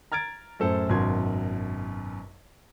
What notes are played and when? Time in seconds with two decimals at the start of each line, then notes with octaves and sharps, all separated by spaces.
0.12 A#5 F6 G#6 A6 D7
0.60 F#2 A2 A4 C5
0.89 G#1 F#2 B2 C6 G#6